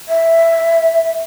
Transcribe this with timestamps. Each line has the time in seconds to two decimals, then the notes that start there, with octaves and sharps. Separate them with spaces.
0.08 E5